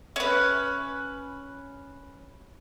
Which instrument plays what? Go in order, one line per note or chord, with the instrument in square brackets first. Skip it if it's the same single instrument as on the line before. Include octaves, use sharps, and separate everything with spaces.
[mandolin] C#4 B4